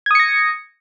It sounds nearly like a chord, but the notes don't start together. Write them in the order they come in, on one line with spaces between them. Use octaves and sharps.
G#6 D#6 C#7 A#6